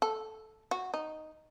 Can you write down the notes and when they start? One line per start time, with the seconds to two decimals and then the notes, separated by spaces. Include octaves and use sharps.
0.02 A4
0.71 F#4
0.94 D#4